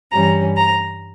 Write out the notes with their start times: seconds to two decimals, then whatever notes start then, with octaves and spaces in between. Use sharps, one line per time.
0.12 G2 E3 G3 C#4 A#5
0.57 A#5